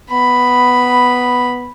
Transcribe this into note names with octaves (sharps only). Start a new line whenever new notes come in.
B3 B5